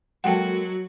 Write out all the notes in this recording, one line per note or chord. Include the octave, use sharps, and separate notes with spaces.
F#3 G#3 A#3 F#4 A4 F#5 G5